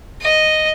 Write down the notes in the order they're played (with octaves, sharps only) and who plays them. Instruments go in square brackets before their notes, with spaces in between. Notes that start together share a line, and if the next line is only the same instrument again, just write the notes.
[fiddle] D#5